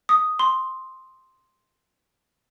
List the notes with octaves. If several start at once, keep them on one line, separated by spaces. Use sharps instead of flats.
D#6
C6